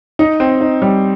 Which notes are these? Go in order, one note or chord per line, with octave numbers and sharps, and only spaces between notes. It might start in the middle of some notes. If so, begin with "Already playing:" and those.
D#4
C4
D#4
G3